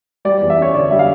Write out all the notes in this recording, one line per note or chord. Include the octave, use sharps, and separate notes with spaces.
G3 D5
E2 D5
E5
C#4 C#5
D3 D5
G3 E5
F5